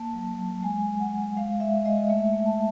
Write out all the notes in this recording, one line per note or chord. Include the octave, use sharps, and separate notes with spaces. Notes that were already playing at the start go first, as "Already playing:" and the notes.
Already playing: A#3 A5
F#3
F#3
G#3 G#5
G#3
F#5
G#3
G#3 F5
G#3 E5
G#3 D#5
A3 E5
A3
A5